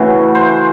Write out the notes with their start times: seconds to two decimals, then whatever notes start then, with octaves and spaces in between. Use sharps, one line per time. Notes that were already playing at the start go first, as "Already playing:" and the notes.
Already playing: C#3 E3 A3 F#4
0.35 C5